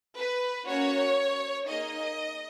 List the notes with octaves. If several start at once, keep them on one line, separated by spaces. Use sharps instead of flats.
B4
A#3 C#4 F#4 C#5
A#3 D#4 G#4 D#5